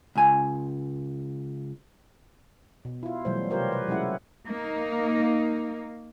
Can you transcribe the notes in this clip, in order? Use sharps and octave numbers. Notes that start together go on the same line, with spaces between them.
C#2 G#5
B2
E4 F4
B2 E3 F#3 G3 A3 C5
C3 F4 G4 A#4 C5 C#5
B4
F#3 G#3 C#4 E4 F#5
A#3 D#4